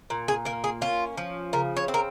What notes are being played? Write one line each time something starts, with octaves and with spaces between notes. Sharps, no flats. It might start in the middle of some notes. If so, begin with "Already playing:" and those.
A#2
G#4
A#3 A#4
G#4
C#4 F4
F3
C#3 A#4
C#5
C4
A#4